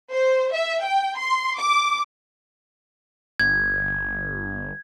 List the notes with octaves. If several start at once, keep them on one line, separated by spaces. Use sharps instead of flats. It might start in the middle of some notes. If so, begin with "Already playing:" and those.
C5
E5
G5
C6
D6
G1 G#6